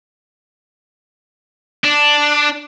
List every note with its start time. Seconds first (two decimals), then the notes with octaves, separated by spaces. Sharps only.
1.84 D4